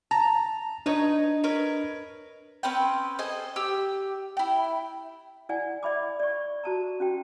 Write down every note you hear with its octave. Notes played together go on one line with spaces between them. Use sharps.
A5 A#5
D4 D#4 B4 C#5 D#5
A#4 B4 C#5
C4 C#4 B4 G5
A4 C5 D#5 G#5
G4 E6
E4 G5
E4 D5 F#5 G#5
D5 E5 B5 D6
D5 C#6
F#4 A5 A#5
C#4 F#4 G5